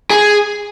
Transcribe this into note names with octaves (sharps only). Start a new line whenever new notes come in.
G#4